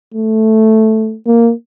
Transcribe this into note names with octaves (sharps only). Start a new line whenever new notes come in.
A3
A#3